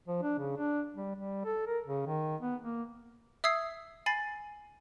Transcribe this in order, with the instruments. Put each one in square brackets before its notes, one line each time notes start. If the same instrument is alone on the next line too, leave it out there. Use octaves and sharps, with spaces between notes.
[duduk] F3
D4
C#3
D4
G3
G3
A4
A#4
C#3
D#3
B3
A#3
[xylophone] E5 D#6 E6 G#6 C7
G#5 B5 A6 C7